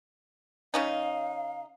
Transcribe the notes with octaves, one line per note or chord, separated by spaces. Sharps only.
C#3 C#4 D#4 F5